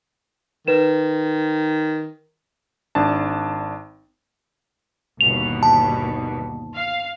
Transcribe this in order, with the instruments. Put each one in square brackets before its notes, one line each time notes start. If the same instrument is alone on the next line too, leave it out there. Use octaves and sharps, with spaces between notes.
[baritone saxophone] D#3 [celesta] B4 E7
[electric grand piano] G#1 D4 A5
[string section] G1 D#2 B2 [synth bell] F7
[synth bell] A5
[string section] F5